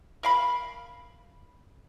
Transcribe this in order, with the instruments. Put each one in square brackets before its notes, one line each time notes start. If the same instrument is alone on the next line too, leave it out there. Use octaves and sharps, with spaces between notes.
[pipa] A#4 F5 B5